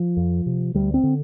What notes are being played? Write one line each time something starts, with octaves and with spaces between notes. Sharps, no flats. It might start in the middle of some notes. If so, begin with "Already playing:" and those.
Already playing: F3
F2
C3
D2 G3
C4
D3